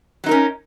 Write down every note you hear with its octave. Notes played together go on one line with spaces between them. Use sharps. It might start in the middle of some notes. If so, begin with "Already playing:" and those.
F#3 C#4 D#4 A#4